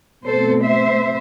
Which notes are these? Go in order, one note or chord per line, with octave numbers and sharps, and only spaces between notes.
B2 A3 C4 A4 C5
C5 E5